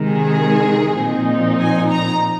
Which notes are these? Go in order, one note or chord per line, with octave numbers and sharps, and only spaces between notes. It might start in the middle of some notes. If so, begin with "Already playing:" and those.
Already playing: C3 D#3 G#3
G#4
A#2 F3 C4 D#4
G#5
A#5